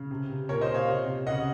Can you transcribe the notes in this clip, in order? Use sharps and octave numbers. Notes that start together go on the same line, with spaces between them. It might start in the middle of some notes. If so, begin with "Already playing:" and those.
Already playing: C#3
C3
C3
A#2 A#4 C#5
C5 D#5
A#2
C#5 F5
C3
C3
C#3 D#5 F#5